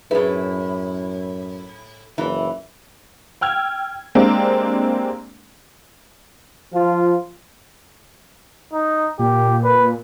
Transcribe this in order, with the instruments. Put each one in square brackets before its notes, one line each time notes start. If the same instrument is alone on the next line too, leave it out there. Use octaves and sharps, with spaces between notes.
[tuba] F#2 [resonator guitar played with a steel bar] A2 E4 [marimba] G#4 B4
[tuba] F#1 [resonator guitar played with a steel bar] E3 E4
[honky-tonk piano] G5 E6 F6 G#6
G#3 A#3 C4 D4 G4
[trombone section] F3 F4
[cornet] D#4
[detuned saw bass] A#2 [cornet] G4
[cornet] B4